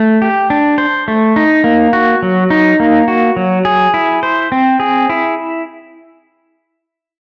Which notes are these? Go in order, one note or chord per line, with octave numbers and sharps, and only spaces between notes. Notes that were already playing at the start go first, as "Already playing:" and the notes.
Already playing: A3
G4
D4
C5
A3
D#4
A#3
F#4
F#3
D#4
A#3
F#4
F#3
G#4
E4
C5
C4
G#4
E4